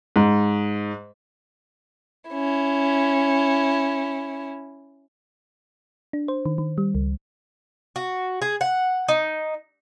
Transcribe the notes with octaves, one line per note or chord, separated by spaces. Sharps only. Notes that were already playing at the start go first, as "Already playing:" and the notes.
G#2
C#4 E4
D4
C5
D#3
D#3
G3
C#2
F#4
G#4
F#5
D#4